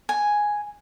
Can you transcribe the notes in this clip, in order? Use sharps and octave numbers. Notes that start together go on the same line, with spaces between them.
G#5